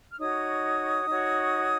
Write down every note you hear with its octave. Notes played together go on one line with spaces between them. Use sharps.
F6
D#4 F#4 C#5 D#6
D#4 F#4 C#5